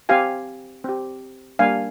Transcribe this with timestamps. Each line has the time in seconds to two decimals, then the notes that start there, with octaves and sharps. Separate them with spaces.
0.09 C4 G4 F5 G#5
0.84 C4 G4
1.59 G3 A#3 D4 F5 G#5